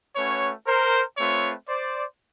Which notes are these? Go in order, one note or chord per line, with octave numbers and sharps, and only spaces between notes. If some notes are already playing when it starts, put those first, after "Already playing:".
A3 C#4 F#4 B4 C#5
A#4 C5
A3 C4 F4 B4 C#5
C5 D5